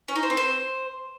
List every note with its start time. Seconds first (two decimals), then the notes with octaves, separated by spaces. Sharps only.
0.08 C#4
0.16 D#4
0.23 C5
0.30 C4
0.37 C5